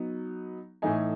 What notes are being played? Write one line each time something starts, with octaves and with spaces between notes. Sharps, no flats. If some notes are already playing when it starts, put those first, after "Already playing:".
Already playing: F#3 B3 D#4
A2 E3 A3 D#4 G#5